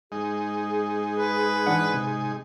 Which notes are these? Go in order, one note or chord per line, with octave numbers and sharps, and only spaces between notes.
G#3 D#4 G#4
B4
E3 D4 F#5
C3